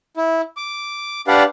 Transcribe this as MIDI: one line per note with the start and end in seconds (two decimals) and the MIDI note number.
0.17 0.41 64
0.57 1.21 86
1.28 1.43 62
1.28 1.43 67
1.28 1.43 71
1.28 1.43 74
1.28 1.43 77
1.28 1.43 78